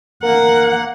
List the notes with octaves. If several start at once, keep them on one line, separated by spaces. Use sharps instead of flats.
A#3 A#4 F#5